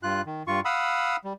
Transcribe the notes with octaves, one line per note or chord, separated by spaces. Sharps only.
G2 F4 F#6
D#3
G2 F4 C#6
F5 F#5 B5 D#6 E6
G3